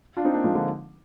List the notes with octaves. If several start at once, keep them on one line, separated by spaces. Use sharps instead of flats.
D4 F4
C4 D#4
A#3 D4
F3 G#3
D3 F3